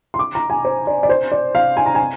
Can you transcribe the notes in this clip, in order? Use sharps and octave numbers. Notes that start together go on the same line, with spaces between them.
C6
D6
A#5
G#5
C5
D5
D5
C5
D5
F5
G#5
A#5
G#5